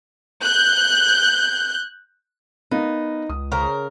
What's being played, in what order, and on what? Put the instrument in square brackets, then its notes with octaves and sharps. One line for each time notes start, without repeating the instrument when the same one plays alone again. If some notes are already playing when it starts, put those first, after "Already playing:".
[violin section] F#6 G6
[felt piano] B3 A#4 F5 [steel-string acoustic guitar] D#4
[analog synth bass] C#2 [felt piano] D#6
[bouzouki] C#3 A#4 [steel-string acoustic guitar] C5